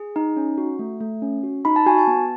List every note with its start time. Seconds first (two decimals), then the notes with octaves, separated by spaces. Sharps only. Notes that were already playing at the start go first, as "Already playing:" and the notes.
Already playing: G#4
0.16 D#4
0.37 C#4
0.58 F#4
0.79 A3
1.00 A3
1.22 C#4
1.43 F#4
1.65 D#4 B5
1.76 A5
1.86 F#4 G#5
1.98 A5
2.07 B3